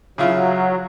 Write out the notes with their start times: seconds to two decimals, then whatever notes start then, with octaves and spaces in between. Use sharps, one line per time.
0.18 C#3 F#3 E4 F4